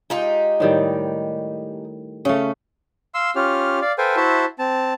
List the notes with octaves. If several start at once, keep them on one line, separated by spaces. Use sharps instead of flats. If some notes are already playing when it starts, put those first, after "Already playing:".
G#3 D#4 F4 G4
A2 D#3 G3
C#3 A3 C#4
F5 C6 E6
C#4 F4 G4 F6
D5 F5
A4 B4 C5 F5 G5 G#5
E4 F#4 C5 E5 A5
C4 A5